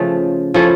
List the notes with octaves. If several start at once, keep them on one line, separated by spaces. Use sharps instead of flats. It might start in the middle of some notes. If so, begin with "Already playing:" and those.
Already playing: C#3 F3 A3
F3 C#4 E4 A4